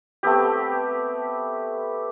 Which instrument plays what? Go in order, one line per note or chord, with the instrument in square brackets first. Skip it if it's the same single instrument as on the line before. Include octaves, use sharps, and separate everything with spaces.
[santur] A3 B3 C4 G4